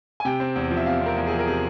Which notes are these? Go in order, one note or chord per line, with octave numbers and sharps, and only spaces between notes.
G#5
C3 G5
C4
E2
F3
E5
C3 F5
C4 A#4
E2
G#4
F3
A#4
C3 G#4